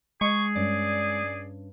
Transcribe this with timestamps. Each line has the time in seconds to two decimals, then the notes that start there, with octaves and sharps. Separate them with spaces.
0.21 G#3 G#4 C#6
0.56 G2 C#4 D5